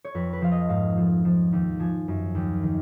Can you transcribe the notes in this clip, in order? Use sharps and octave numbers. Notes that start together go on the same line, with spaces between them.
C#5
F2 B4
B4
F3 F5
D#5
G#2 F5
F3
F3
D#2
F3 G#5
F#2
D#2
D#3